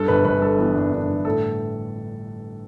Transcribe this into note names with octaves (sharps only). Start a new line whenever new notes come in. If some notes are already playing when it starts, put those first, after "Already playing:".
Already playing: G2 A4
G1 B4
G1 B4
G2 A4
E3 B3
G2 D4
G1 D4
G1
A2 A4